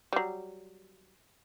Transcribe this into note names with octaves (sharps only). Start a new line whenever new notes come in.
F#3 G3